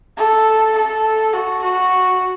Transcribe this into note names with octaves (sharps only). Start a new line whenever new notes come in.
A4
A4
F#4
F#4